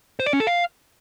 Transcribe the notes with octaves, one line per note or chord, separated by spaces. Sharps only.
C5
D5
C#4
A4
F5